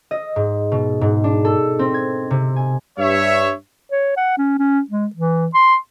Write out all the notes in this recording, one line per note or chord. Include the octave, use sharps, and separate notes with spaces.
D#5
G#2
B2
G#2
D4
A4
C4
G#6
C3
G#5
G2 C#5 E5
C#5
F#5
C#4
C#4
G#3
E3
C6